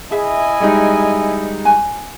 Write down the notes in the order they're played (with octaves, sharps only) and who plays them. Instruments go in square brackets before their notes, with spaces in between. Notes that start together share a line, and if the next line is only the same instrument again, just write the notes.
[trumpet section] E4 D#5 G#5 [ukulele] G#4 E5
[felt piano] G3 G#3 D#4
[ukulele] F#4 G#5